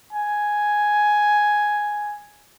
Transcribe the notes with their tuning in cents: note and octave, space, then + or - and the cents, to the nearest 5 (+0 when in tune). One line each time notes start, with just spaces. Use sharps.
G#5 +5